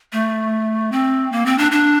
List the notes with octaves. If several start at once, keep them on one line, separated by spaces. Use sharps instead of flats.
A3
C4
A#3
C4
D4
D4